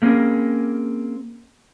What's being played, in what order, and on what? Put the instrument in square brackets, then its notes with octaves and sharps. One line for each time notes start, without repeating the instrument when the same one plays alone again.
[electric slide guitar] A3 A#3 C4 C#4 G#4 A#4